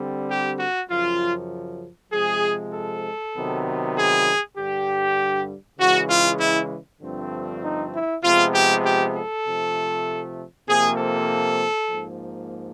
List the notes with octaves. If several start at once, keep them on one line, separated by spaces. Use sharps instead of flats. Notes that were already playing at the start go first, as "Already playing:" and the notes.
Already playing: D3 G3 C4
G4
F#4
F#2 C#3 F3 F4
C3 F3 G#3 G#4
A4
C3 D#3 F#3 B3
G#4
G2 D3 G3 G4
C#3 E3 G#3 F#4
F4
E4
G2 D3 F3 A3 C4
D#4
E4
C3 F3 G#3 B3 F4
G4
G4
A4
C3 F3 A3
C3 F3 A#3 G#4
A4
G#2 F3 A#3